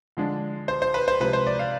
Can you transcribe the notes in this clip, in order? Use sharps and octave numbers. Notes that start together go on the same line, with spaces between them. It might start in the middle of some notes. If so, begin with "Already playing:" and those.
D3 F3 G#3 D4
C5
C5
B4
C5
C3 F3 G#3 B4
C5
D5
F5